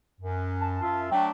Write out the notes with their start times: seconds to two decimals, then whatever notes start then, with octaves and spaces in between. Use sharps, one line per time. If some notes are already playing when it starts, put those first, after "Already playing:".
0.21 F#2
0.61 A5
0.81 F#2 F4 E5
1.11 F#3 A3 D4 G5